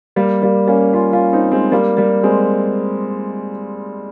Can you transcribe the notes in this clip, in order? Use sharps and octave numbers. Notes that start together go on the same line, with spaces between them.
G3 A#3
G3 A#3
A#3 C#4
C#4 F4
C#4 F4
C4 D#4
G#3 C4
G3 A#3
G3 A#3
G#3 C4